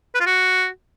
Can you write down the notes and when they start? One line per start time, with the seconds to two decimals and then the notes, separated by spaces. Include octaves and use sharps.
0.15 B4
0.20 F4
0.26 F#4